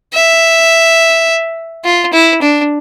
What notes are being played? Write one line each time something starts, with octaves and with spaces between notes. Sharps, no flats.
E5
F4
E4
D4